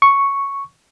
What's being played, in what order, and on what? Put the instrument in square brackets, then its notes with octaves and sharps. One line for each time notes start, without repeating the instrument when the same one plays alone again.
[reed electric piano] C#6